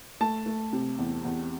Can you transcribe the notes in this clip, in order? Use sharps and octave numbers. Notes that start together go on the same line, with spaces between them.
A3 A5
A3
C3
E2
E2